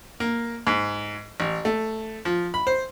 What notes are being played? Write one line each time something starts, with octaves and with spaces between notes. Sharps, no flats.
A#3
G#2
A1
A3
F3
B5
C5